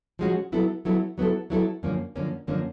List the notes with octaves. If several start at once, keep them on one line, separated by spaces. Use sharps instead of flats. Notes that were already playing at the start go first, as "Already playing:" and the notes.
F3 G#3 C#4 F#4
F#3 B3 E4 A4
F#3 B3 E4 A4
F#3 B3 E4 A4
F#3 B3 E4 A4
F#2 D3 F3 A#3 C#4
F#2 D3 F3 A#3 C#4
F#2 D3 F3 A#3 C#4